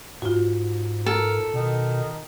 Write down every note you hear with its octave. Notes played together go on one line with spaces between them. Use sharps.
G#2 F4 F#4
A4 A#4
B2 D#3